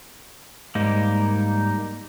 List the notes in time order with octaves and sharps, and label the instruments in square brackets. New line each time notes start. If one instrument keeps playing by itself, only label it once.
[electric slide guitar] G#2 [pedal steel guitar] G3 A#3 D#4